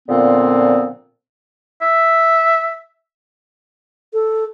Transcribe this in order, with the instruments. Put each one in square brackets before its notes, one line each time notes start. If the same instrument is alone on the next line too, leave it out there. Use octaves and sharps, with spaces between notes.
[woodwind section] A#2 D3 F3 B3 C4
[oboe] E5
[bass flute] A4